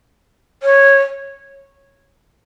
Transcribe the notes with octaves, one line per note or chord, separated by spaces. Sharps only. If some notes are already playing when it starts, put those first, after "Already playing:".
C#5